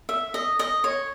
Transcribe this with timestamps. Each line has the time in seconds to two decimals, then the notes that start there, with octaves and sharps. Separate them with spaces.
0.09 E5
0.34 D#5
0.59 D#5
0.84 C#5